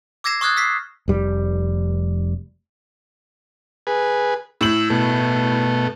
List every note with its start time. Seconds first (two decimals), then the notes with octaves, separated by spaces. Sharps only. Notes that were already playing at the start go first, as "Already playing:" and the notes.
0.24 D6 E6 G#6 A#6 C7 E7
0.41 C#6 D#6 F6 F#6 G#6 A6
0.57 E6 B6 C7
1.08 F1 G3
3.87 G#4 B4
4.61 A2 E6 F#7
4.90 B2 A3